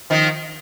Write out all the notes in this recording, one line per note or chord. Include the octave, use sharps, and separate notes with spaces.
D#3 F3